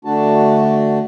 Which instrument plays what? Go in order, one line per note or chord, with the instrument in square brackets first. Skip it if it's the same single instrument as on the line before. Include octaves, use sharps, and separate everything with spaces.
[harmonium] D3 A3 D4 F#4 A5